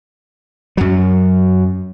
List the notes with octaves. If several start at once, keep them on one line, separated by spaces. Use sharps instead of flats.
F#2 F#3